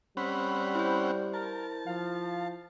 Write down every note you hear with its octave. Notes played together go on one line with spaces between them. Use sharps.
G3 C4 C#4 F#5 B5
E4 C5
A#4 A5
F3 F5